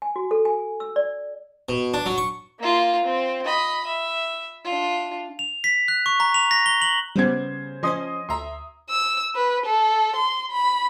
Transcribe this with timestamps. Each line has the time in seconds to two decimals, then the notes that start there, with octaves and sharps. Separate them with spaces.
0.02 G#5
0.16 F#4
0.31 A4
0.45 G#5
0.80 E6
0.96 D5
1.69 B2
1.94 D4
2.06 F#3
2.18 C#6
2.59 A#3 F4
3.04 C4
3.45 D#5 B5
3.87 E5
4.64 D4 F4
5.39 F7
5.64 B6
5.88 F#6
6.06 C#6
6.20 A#5
6.34 F7
6.51 A#6
6.66 G7
6.82 F#7
7.16 C#3 G3 B3 C5 G#6
7.83 F3 C#4 C5 D#5 C6 D#6
8.29 D2 E5 A#5 C6
8.90 E6
9.35 B4
9.66 A4
10.16 C6
10.51 B5